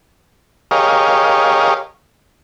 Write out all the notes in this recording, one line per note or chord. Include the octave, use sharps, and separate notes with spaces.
G4 G#4 A#4 C#5 D#5 F5